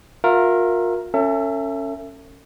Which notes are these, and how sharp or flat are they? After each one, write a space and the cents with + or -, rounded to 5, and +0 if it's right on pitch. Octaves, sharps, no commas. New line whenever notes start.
F4 +40 A#4 +0 E5 +30
C#4 +0 A4 +40 E5 +20